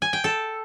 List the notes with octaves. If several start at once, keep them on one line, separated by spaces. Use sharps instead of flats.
G#5
G5
A4